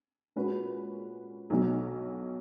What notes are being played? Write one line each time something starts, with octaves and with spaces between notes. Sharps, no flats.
A#2 G#3 C#4 F#4 B4
B1 B2 F#3